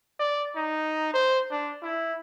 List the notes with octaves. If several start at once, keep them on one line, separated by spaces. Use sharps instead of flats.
D5
D#4
C5
D4
E4